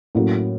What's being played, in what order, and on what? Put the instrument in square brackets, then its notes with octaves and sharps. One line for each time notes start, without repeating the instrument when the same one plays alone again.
[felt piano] A2 F#3 A#3 C#4 F#4